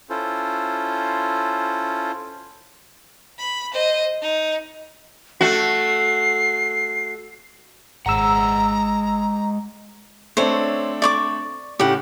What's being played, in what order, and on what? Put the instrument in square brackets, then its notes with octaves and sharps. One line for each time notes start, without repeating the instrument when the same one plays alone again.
[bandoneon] C#4 E4 F4 A4 C5
[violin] B5
C5 D#5
D#4
[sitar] A3 F#4 [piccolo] C7
[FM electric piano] G#1 E6 [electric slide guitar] G#3 G#4 F#5 [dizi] A#5
[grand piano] A3 C4 D4 [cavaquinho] C5 C#5
[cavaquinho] D5 C#6 D6
[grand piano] A2 C#3 [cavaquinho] G4 F#5